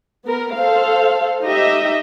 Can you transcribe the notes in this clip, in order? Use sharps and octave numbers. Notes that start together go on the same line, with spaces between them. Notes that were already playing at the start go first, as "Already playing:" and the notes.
B3 A#4
A4 C5 F5
D#4 G4 D#5 E5